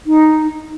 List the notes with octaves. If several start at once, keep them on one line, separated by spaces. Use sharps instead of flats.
D#4